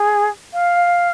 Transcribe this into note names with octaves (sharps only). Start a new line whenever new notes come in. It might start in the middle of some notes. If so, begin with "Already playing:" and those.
Already playing: G#4
F5